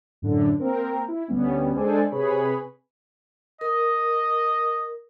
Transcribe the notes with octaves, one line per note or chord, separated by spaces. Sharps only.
F#2 A2 D3
A#3 C4 A#4
E4
D2 G3 B3 C#4
G#3 D4 A4 C5 D5 G#5
C3 G#4 B4 C#5 B5
A#4 D#5